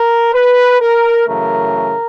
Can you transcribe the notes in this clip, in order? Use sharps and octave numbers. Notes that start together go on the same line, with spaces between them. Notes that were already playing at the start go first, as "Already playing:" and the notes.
Already playing: A#4
B4
A#4
F#2 C#3 E3 A3 A#4